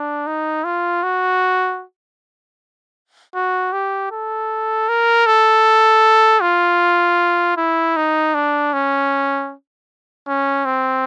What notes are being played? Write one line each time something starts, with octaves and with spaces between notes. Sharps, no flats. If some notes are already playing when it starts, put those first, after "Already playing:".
Already playing: D4
D#4
F4
F#4
F#4
G4
A4
A#4
A4
F4
E4
D#4
D4
C#4
C#4
C4